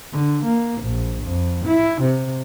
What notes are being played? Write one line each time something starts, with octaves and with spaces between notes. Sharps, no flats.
D3
A#3
A#1
F2
E4
C3